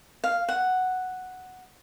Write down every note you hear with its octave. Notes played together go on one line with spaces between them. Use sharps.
F5
F#5